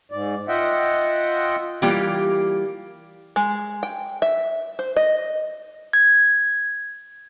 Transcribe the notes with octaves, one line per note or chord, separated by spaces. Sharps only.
G#2 D5
F4 D#5 E5 F#5 G5
E3 G3 A#3 F4 G4
G#3
G5
E5
C5
D#5
G#6